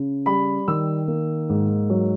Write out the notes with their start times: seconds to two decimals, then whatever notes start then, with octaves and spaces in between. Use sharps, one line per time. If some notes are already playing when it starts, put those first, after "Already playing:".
Already playing: C#3
0.26 G3 B5
0.68 D#3 E6
1.08 A#3
1.49 G#2
1.90 F#3